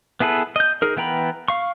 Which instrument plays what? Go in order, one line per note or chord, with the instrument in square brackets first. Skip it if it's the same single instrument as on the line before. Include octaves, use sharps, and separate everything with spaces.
[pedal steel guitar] B3 E4 G#4 A4 B4
D#5 G6
D#4 G#4 A#4
E3 B3 G5 A#5 B5
F5 C#6